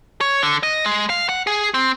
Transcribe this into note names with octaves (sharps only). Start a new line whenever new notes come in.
C#5
D3
D#5
G#3
F5
F#5
G#4
C4